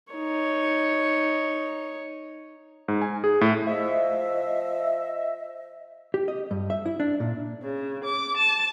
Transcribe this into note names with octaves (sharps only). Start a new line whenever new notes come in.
D#4 C#5
G#2
G#5
G#4
A2
F3 D#5 E5
G4
D#5
G2
E5
E4
D4
A#2
C#3
D6
A5